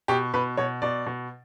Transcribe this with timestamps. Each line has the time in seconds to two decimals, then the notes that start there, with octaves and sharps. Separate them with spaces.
0.08 B2 G4
0.34 B2 B4
0.57 B2 C#5
0.82 B2 D5
1.06 B2